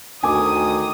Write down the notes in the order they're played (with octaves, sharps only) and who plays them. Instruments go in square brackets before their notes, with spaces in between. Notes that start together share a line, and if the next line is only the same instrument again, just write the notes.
[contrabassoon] D2 [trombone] D#3 [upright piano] G#5 D6 [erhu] D#6